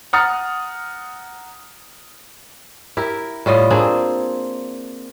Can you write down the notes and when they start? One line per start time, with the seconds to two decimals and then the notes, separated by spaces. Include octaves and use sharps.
0.13 F#5 A#5 D#6 F6 A6 C#7
2.97 E4 G4 A#4
3.46 A2 G3 F4 D#5
3.70 A#3 C4 D4 G#4